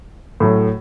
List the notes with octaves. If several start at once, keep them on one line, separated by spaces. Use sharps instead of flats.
A2 F#3